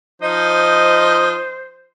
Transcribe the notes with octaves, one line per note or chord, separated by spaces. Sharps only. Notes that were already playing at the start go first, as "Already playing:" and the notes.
F3 D#4 C5 D#5